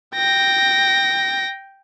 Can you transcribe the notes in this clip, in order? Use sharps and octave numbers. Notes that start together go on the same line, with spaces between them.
G5 A#6